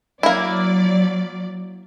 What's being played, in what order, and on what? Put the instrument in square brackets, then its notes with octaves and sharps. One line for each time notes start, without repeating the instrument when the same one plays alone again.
[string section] F#3 D5 [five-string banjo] A#3 E4